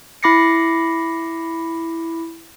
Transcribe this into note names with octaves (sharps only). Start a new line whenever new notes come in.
E4 B5 D6 A#6 C7 C#7